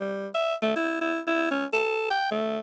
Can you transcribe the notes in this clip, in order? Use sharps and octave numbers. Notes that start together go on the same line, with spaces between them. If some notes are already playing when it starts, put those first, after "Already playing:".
G3
E5
A3
E4
E4
E4
C#4
A4
G5
A3